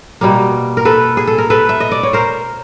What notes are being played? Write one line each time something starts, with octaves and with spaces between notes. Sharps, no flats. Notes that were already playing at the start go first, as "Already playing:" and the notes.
B2 G3 A#3
A#4
A4 B4
G#4
A4
A#4
A4 B4
E5
D#5
D5
C#5
A#4 C5